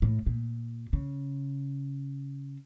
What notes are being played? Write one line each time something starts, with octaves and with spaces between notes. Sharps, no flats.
A2
A#2
C#3